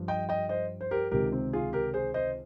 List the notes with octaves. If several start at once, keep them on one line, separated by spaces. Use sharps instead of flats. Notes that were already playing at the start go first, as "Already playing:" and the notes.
Already playing: G2 F3
D#5 G5
D#5 G5
C5 D#5
C5
G4 A#4
C#2 C3 D#3 G4 A#4
C4
F4 G#4
G4 A#4
G#4 C5
C5 D#5